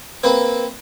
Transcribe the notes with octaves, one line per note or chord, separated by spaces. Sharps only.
A#3 C4 B4